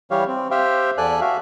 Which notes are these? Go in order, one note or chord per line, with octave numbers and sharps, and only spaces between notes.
E3 G3 G4 C#5 F5
C4
G4 C5 E5 F5 G5
E2 A4 D5 G#5 F#6
F#4 E5 F5